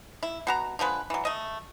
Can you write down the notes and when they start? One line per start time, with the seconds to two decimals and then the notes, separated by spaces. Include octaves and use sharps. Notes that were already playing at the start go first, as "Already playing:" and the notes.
0.23 E4
0.47 B2 F#4 A#5
0.79 D3 F3 G#3 B4
1.10 E3 F#3
1.25 A3 D#5